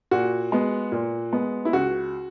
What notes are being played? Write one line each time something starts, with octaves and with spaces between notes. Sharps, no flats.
A#2 F#4
G#3 B3
A#2
G#3 B3
E4
C#2 F#4